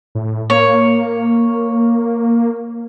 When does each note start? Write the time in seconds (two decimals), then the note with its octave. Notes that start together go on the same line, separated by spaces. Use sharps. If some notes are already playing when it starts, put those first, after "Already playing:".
0.15 A2
0.50 A#3 C#5